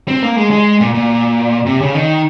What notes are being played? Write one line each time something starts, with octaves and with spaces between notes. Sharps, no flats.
C4
A#3
G#3
G#3
A#2
A#2
C3
C#3
D#3